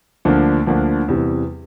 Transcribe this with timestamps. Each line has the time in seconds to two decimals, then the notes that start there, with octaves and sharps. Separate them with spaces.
0.25 D2 D3 F3 A#3 D4
0.66 D2 D3 F3 A#3 D4
1.08 E2 C3 E3 G3